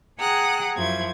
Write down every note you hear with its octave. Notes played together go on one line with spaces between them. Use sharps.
G#4 F#5 G5 A#5 D#6 F#6
F#2 F3 E4 G#6